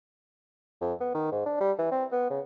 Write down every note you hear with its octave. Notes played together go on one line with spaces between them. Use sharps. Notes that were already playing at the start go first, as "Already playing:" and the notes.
F2
B3
D#3
G#2
D4
G3
E3
C4
B3
C#3